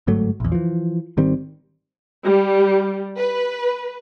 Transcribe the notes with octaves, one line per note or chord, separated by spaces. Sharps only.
G1 G#2 F#3 A3
A#1 E2
E3 F3
G#1 D#3 G3 C4
G3
B4